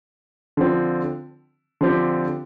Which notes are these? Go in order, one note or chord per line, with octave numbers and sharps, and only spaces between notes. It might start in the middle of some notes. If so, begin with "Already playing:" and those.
D3 F3 C4
D3 F3 C4 G4